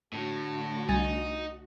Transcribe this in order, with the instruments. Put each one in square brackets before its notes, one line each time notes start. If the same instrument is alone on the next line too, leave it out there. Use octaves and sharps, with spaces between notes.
[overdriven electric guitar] A2 [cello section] D3 A3 F#4
[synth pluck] C2 G#5 A6 [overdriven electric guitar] D#4